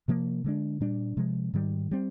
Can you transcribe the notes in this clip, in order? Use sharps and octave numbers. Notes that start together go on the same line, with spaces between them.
C3 F3 A#3
D3 G#3 D4
A#2 G3 D4
C3 F3 G#3
G#2 D#3 G3
G3 C4